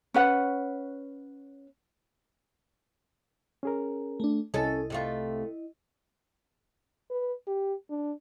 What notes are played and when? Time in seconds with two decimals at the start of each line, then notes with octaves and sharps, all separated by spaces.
0.14 C#4 B4 F#5
3.63 C#4 G#4 A#4
4.20 A3 D4
4.54 C2 C#4 E4 A4 D#5
4.90 C3 A3 F4
7.11 B4
7.47 G4
7.90 D4